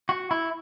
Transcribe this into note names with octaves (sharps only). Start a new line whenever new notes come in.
F#4
E4